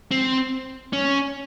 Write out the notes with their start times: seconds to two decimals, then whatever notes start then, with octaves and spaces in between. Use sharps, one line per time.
0.12 C4
0.93 C#4